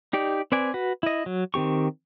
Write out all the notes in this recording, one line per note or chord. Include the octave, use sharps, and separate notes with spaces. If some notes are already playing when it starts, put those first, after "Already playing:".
D#4 G4 D5
C4 B4 D5 G#5
F#4 B4
E4 D#5
F#3
D#3 C4 G4 C#6